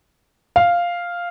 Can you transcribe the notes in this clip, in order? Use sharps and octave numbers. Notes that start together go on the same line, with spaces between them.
F5